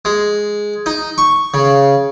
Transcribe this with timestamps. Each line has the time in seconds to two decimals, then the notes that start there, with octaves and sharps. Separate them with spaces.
0.05 G#3
0.86 D#4
1.18 C#6
1.54 C#3